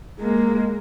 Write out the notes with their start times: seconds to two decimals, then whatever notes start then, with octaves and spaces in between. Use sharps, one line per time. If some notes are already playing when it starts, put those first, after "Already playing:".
0.20 G#3 A#3